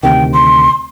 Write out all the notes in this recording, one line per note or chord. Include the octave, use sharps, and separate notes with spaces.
D2 C3 D#3 G5
C6